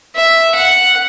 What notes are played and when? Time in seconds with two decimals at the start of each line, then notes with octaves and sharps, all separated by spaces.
0.15 E5
0.55 F#5